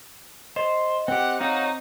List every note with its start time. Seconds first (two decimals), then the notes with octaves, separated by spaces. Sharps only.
0.56 C5 D#5
1.08 C4 G4 F#5
1.41 C4 D#4 F#4 C#5 F5